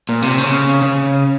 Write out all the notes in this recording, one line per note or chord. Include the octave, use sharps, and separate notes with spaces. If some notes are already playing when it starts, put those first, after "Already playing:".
A#2
C3
C#3
C#3